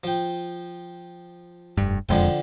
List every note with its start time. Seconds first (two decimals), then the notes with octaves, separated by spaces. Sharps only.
0.04 F3 G5
1.77 F1 G2
2.09 E1 F2 D3 F3 G#3 G5